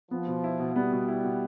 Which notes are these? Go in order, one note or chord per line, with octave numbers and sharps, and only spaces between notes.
F3 B3
B2
E4
B2
G3 B3
B2
E4
B2